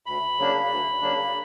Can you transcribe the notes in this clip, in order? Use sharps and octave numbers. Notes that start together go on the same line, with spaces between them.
D2 B5
C#3 F#3 A#3 D4
D2
C#3 F#3 A#3 D4